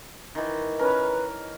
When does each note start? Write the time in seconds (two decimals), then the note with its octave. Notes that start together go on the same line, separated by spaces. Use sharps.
0.35 D#3 E3
0.79 C#4 A#4 B4